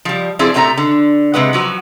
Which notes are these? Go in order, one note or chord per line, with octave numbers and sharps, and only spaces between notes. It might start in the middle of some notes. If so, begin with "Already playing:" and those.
F3 G3
F3 C4 E4 G#4 A4 D5
A2 C3 A3 D4 E5 A#5
D3
C3 G#3 B4 F#5
F3 F#3 F#4